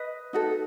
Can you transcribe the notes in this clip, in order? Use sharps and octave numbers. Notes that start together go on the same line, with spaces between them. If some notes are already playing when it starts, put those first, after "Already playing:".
Already playing: B4 D#5
D#4 F#4 A4